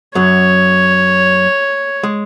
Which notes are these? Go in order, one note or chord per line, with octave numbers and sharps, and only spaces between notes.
F#2 F#3 C#5
G#3